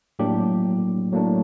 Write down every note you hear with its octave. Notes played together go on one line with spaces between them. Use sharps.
A2 F#3 A#3 D4 G4
A2 F#3 A#3 D4